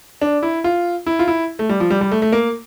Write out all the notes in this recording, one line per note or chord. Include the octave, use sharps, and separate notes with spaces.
D4
E4
F4
E4
F4
E4
A3
G3
F3
G3
G3
A3
A3
A#3